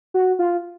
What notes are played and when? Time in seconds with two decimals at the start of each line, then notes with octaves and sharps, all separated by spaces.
0.14 F#4
0.39 F4